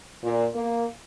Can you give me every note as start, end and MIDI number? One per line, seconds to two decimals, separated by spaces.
0.23 0.46 46
0.54 0.85 58